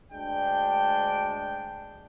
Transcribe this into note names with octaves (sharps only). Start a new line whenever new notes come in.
D2 G#3 D4 G5